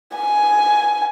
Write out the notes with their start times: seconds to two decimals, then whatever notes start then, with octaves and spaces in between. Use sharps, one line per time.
0.17 G#5